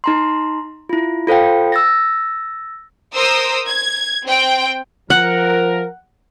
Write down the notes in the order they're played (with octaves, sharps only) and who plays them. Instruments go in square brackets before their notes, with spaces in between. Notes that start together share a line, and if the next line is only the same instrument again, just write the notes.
[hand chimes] D#4 A#5 C6
E4 F4
F4 A4 C5 F5 G5
E6 A6 A#6
[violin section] A#4 C5 D#6 E6
G#6
C4 G5
[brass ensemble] F3 A#4 [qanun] F#5